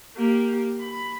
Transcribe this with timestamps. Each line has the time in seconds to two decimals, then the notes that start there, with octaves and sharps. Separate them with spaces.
0.16 A#3 G4
0.81 B5